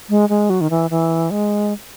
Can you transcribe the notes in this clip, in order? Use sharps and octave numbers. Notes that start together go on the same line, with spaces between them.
G#3
G#3
F#3
D#3
E3
E3
G#3